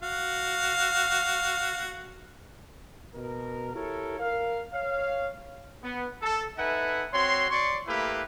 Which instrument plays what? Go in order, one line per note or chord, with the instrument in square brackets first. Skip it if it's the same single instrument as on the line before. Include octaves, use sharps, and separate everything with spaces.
[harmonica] F#4 F5
[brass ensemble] B2 A#4
E4 G4 A4 A#4 C#5
A#4 F5
C#5 F5
[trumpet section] B3
A4
D#4 A4 B4 E5 F#5 G#5
C4 F#4 C#5 C6
C#5 D5 C6 C#6
A3 A#3 E4 G4 B4 F5